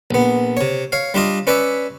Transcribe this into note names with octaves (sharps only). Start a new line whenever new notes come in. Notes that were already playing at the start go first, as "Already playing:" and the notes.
A#1 B3
C3 C#5
C#5 F5
G3 D4 F4 D#5
C#4 B4 C#5 D5 E5